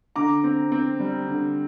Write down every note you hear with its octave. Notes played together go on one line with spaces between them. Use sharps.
D3 A#5 D6
C4
C4
G3
D3